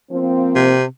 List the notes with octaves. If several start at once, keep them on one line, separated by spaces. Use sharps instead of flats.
F3 A#3 C4
C3